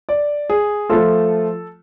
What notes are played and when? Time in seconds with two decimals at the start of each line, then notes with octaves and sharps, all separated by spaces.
0.09 D5
0.50 G#4
0.89 F3 A3 F4 A4